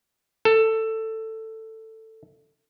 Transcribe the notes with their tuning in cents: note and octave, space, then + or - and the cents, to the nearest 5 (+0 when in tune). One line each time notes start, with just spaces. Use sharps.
A4 +10